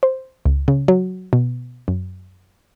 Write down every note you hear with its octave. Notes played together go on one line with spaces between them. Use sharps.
C5
C#2
C#3
F#3
B2
F#2